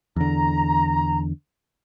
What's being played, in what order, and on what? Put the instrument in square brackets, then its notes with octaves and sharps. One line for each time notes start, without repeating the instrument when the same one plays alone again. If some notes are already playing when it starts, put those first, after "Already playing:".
[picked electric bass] E2 D3 [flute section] A#5